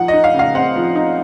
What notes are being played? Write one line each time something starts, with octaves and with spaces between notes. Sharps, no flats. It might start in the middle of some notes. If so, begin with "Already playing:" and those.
Already playing: F3 D#4 F#5
D#5
D#4
F5
C#3
F5
C4 F#5
F3
D#4